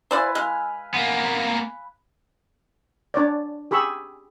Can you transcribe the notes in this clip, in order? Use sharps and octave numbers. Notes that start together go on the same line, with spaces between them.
E4 B4 C5 D5 F5 G#5
G#3 F5
A#3 B3
D4 C#5 D5
G4 G#4 B5 C#6 E6